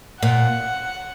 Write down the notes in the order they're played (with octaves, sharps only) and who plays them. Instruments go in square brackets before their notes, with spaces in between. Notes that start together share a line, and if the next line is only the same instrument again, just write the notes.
[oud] A#2 [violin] F#5